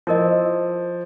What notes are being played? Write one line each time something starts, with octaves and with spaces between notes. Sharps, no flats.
F3 E4 A#4 D#5